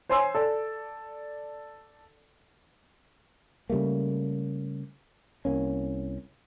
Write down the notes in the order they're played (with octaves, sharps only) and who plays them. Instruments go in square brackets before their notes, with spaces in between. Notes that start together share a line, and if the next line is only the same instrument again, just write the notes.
[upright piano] C5 C#5 G#5 C6 E6
A4 D5
[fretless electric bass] C#3 G3 A3 A#3
C2 A#3 C#4